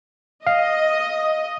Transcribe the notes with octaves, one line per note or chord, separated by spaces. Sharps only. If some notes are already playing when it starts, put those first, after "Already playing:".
D#5 F5